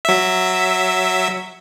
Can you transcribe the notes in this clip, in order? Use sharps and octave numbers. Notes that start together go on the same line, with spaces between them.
F#3 E5